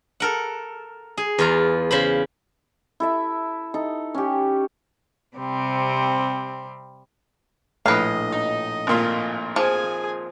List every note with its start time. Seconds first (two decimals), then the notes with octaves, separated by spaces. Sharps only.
0.20 A4 A#4 F#5
1.17 G#4
1.39 E2 F4 A#5
1.91 C#3 C5 B5
3.00 E4 A4 E5
3.74 D#4 A4
4.15 C#4 G4
5.35 C3 G3 C4
7.86 A#1 A2 B4 D#5 F5
8.32 D#4
8.87 G#1 A#2 F4
9.56 F3 G#4 G#5